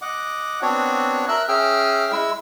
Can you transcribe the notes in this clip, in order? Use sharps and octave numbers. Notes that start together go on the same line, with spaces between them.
D#5 F#5 D6
B3 C4 D4 F#4 C#5
A#4 E5 E6 F#6
C#4 G#4 E5 G5 E6 F6
G#3 E4 E6